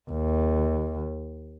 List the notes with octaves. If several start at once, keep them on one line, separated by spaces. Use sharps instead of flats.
D#2